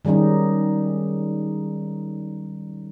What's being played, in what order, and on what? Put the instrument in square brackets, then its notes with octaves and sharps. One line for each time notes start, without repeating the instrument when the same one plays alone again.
[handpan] D#3 G3 G#3 C#4 D#4